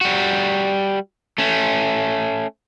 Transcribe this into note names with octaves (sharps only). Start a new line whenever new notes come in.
G3 F#4
A3 C#4